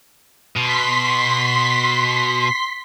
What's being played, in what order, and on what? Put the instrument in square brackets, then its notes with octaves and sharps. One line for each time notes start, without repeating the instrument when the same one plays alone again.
[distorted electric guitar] B2 [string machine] C6 B6